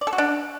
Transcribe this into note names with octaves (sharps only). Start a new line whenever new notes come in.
D5
A4
F#4
D4